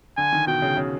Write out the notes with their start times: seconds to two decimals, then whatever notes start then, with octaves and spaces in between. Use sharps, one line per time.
0.17 D3 G#5
0.32 D#3
0.47 B2 G5
0.62 C#3
0.77 C#3